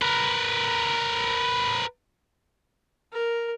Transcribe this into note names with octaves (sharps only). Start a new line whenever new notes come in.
A#4 B4
A#4